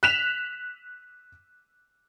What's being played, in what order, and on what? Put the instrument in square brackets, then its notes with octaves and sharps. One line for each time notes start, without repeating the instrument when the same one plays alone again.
[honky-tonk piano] F#6 B6 E7 F7